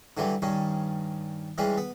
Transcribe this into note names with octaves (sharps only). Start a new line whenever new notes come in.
D3 E3 F#3 G3
G2 D#3 C#4
E3 G3 G#3 C#4
B3